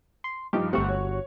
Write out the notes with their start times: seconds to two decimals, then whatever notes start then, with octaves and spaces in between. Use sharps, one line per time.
0.24 C6
0.53 G2 F3 D#4 G4
0.73 G1 A3 C4 F#4 G4 F#5
0.89 C#5